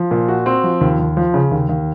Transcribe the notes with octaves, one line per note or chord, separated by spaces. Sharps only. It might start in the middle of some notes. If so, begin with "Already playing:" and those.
Already playing: F3
A#2
F#4
C4
F3
D#2
D#2
F3
C#3
D#2
D#2